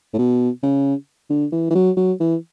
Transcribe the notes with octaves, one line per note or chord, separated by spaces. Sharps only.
A2
B2
C#3
D3
E3
E3
F#3
F#3
E3